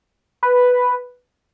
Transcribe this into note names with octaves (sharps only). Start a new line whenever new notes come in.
B4